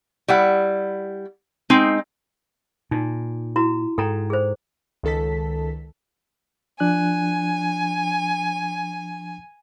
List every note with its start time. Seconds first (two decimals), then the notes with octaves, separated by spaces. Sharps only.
0.28 G3 E4 F#5
1.70 G#3 C4 D#4
2.91 A#2 D#4
3.56 E4 F#4 A#5
3.98 G#2 A4 G5 A#5
4.30 G#4 A4 C5
5.03 C#2 D#3 A4 A5 B6
6.80 F3 D4 G#5 F#6